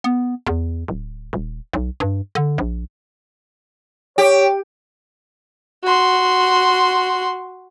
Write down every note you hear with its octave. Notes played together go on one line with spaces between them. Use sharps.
B3
E2
D1
D#1
B1
G2
D3
A#1
G4 C#5
F#4 C6